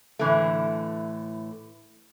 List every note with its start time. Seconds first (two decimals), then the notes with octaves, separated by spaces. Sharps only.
0.19 A2 D3 E3 A3